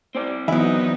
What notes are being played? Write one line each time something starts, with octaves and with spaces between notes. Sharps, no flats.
C4 C5 D5
E3 F#3 B3 D#4 E4